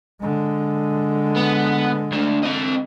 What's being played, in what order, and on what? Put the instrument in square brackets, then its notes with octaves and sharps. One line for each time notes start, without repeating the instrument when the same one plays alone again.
[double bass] D3 G#3
[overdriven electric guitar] B3
D2 D4
C4 D#5